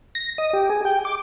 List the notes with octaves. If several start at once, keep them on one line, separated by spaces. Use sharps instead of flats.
A#6
D#5
G4
G#4
G5
D6